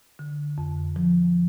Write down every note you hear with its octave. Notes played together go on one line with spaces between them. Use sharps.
D3
F2
F3